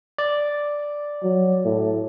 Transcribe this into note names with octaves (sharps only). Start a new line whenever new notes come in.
D5
F#3
A2